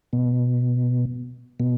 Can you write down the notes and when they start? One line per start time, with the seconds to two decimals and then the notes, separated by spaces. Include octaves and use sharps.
0.13 B2
1.60 B2